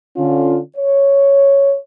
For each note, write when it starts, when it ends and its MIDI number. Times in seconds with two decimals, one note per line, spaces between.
0.17 0.58 50
0.17 0.58 61
0.17 0.58 65
0.77 1.76 73